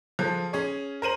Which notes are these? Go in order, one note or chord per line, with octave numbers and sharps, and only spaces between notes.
F3 G#4 A4
C#4 G#4 C#5
A#4 C5 D#7 F#7